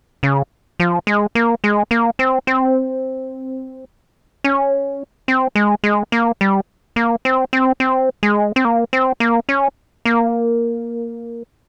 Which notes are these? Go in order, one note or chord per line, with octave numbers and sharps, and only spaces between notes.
C#3
F3
G#3
A#3
G#3
A#3
C4
C4
C#4
C4
G#3
G#3
A#3
G3
A#3
C4
C4
C4
G#3
C4
A#3
C4
A#3
C#4
A#3